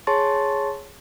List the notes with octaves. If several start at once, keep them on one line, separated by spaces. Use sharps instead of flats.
G#4 C#5 A5 C6 C#6 A6